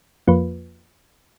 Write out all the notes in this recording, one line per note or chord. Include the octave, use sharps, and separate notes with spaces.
F2 F3 A#3 F4 B4